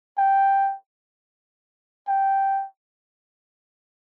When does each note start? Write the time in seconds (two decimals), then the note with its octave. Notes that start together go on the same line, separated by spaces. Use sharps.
0.18 G5
2.08 G5